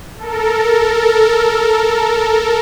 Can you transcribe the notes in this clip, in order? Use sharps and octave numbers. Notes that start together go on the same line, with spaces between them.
A4 A#4